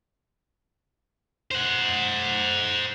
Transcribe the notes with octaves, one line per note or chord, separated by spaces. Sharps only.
C5 F#5